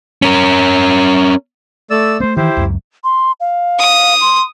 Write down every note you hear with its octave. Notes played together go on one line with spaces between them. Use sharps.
C#4 A#4
A3 D5 E6
A3 B3 C5
D#3 E3 E4 G4 C5
C#2 F#2
C6
F5
D#6
C6